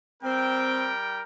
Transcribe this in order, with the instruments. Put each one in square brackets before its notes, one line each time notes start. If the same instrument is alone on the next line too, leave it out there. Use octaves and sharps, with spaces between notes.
[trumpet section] G3 A#4 G5 [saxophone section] C4